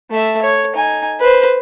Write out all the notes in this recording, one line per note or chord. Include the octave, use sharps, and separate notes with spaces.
A3 E5
C#5
D#4 G#5
B4 C5